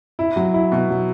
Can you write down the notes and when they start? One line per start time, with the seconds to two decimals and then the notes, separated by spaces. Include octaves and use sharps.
0.19 E4
0.36 F#3
0.54 E4
0.72 B2
0.90 F#3